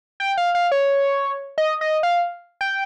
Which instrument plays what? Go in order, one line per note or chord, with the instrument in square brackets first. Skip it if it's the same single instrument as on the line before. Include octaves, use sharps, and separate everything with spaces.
[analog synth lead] G5
F5
F5
C#5
D#5
D#5
F5
G5